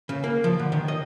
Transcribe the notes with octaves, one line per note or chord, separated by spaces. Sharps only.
C#3
A#3
F3
D3
D#3
D#5